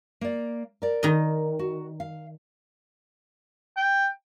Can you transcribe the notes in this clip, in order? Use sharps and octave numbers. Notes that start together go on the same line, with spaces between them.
A#3 D5
A#4 D5
D#3 D#5
F#4
F5
G5